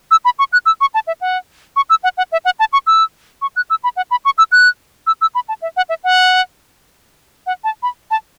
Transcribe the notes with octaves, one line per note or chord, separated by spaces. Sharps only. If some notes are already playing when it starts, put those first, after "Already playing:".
E6
B5
C#6
F#6
E6
C#6
A5
E5
F#5
C#6
E6
F#5
F#5
E5
F#5
A5
C#6
E6
C#6
F#6
E6
B5
F#5
B5
C#6
E6
F#6
E6
E6
B5
A5
E5
F#5
E5
F#5
F#5
A5
B5
A5